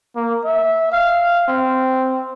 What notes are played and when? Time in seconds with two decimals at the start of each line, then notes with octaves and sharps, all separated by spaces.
0.16 A#3
0.45 E5
0.92 F5
1.48 C4